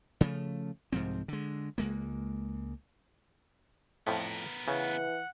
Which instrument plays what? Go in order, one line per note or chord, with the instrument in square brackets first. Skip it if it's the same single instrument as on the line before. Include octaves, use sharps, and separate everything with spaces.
[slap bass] C#3 F3 A3
C2 G#2 F3 C4
D3 G#3
C#2 G#3 A#3
[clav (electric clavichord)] F2 A2 F3 [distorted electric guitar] B3 A#4
[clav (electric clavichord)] C#3 [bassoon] E3 [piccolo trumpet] F#5